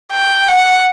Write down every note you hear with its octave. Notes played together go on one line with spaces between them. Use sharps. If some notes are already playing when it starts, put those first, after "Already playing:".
G5
F#5